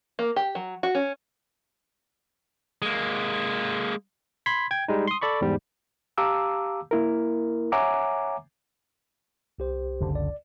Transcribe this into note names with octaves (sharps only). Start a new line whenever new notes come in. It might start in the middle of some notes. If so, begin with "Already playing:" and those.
A#3
G4
F#3
F#4
C#4
G#3 A#3
B5 C6 G#6 B6
G5 G#6
G3 G#3 D#4
C6 D#6
A4 D5 B5 C#6
E2 G#2 G3
G4 F5 A5 A#5 D6 E6
A#3 E4 A#4
C#5 E5 F#5 G#5 A#5 D6
C2 G4 C5
F#1 C#2 D3
D5